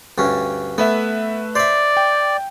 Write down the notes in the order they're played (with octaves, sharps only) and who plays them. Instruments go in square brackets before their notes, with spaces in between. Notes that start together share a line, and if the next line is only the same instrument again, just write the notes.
[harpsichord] D2 G2 C#4
[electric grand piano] A3 B4 E5 [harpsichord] B3
[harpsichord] C5 E5 [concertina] D5
[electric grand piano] G5